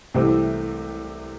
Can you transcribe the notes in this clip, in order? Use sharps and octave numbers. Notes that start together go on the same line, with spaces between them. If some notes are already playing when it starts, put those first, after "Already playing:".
C2 C3 E3 A3 C4